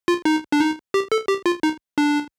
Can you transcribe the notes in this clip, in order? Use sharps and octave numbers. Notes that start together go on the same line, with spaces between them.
F4
D#4
D4
D#4
G4
A4
G4
F4
D#4
D4